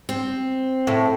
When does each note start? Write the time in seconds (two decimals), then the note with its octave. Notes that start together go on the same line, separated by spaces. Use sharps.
0.09 C4
0.87 A2